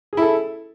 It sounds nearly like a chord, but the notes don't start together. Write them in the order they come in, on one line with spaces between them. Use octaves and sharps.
G#4 E4 A4